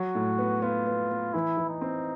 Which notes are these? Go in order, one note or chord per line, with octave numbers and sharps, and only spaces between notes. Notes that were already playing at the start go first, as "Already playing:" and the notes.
Already playing: F#3 F#4
A2
B3
B3 F4
B3
B3
E3 E4
E3
D#4
C4